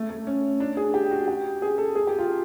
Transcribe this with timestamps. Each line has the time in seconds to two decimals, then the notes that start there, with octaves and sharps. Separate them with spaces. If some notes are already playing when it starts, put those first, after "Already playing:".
Already playing: A3
0.10 A3
0.27 C#4
0.60 D4
0.77 G#4
0.94 G4
1.11 F#4
1.28 G4
1.62 G#4
1.78 A4
1.95 G#4
2.07 G4
2.18 F4